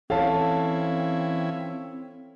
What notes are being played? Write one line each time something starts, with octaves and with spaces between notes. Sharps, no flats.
E3 C4 C#4 E4 A4 C#5 F5 A5